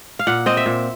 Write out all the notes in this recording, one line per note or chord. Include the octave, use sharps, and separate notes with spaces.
F5
A#2 F#5
C4 D#5
E5
A#2